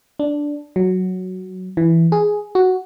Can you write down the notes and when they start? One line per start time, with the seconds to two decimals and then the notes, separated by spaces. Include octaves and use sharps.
0.19 D4
0.76 F#3
1.77 E3
2.12 G#4
2.55 F#4